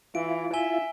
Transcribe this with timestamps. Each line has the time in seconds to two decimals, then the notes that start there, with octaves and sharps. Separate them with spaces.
0.15 E3 E4 F4 D7
0.54 E5 G#5 G7